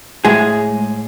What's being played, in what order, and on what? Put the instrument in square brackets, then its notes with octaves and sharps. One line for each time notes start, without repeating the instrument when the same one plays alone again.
[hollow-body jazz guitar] A2 G#3 G#4